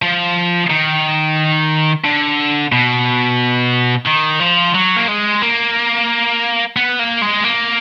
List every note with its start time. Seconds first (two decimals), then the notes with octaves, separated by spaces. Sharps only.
0.02 F3
0.70 D#3
2.04 D3
2.72 B2
4.07 D#3
4.40 F3
4.74 F#3
4.96 A#3
5.08 G#3
5.42 A#3
6.77 B3
6.99 A#3
7.22 G#3
7.44 A#3